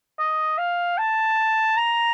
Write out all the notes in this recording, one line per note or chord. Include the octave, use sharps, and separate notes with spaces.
D#5
F5
A5
A#5